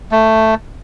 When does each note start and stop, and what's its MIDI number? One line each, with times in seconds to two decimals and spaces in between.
0.11 0.55 57